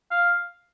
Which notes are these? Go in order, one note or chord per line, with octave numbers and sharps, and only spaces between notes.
F5